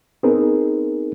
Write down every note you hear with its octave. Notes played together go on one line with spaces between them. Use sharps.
B3 C4 D#4 G#4 A#4